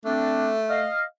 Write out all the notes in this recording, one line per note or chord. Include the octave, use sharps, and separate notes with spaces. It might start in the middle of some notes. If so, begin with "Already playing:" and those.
A3 C4 D4
D#5 F5